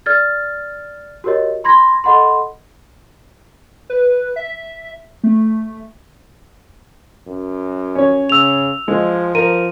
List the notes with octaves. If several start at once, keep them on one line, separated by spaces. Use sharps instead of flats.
D5 F6 G#6 A6
F#4 G4 A#4 C#5 D#5
B5 C6 G#6 A#6
A4 D#5 F#5 B5 C6
B4
E5
A3
F#2
C#4 C#5
C#3 E6 F7
F3 G#3
F3 A#4 D#7